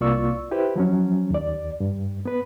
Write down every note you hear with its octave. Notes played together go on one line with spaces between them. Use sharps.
C2 A#3 F4 D5 C#6 E6
E4 G4 B4 C5
F3 F#3 C#4
D#2 D5
G2
B3 B4